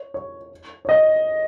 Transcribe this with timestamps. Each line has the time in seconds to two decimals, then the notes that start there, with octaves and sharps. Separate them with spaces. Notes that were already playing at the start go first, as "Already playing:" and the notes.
Already playing: C#5
0.14 C#5
0.85 C#5
0.89 D#5